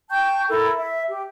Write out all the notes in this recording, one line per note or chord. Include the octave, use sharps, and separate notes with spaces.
G5 A5 C#6 G6
E4 A4 A#4
E5
G4